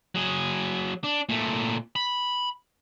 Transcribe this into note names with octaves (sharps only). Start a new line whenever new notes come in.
F#3 G#4
D4
A#2 A3
B5